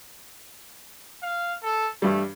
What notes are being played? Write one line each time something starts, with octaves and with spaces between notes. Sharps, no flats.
F5
A4
G2 G3 A3